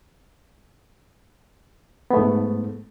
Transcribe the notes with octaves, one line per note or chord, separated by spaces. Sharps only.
G#2 A3 B3